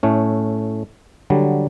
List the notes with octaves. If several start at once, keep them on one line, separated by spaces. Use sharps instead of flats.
A2 A3 C#4
D3 F#3 G3